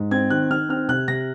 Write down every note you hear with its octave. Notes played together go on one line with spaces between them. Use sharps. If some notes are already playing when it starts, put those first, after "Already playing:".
Already playing: G#2
C4 G#6
D#3 F#6
D#3 F6
C4 F6
C3 F#6
C3 A#6